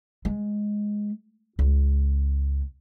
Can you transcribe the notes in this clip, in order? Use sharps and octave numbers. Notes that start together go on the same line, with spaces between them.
G#3
C#2